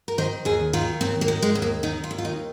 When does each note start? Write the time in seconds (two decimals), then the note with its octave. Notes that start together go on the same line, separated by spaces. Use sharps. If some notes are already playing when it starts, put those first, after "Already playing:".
0.08 A#4
0.18 D#3 C5
0.45 D#2 G#4
0.73 D#3 F4
1.01 D#2 C4
1.21 A#3
1.28 D#3
1.42 G#3
1.55 D#2
1.62 A#3
1.83 D#3 D#4
2.04 F4
2.11 D#2
2.18 F4
2.25 D#4